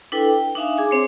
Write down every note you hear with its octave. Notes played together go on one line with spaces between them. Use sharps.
D4 E4 A4 B4 G5
G5
D4 D#4 E5 F5 G#5
G#4 G#5 D6
C4 C5 C#5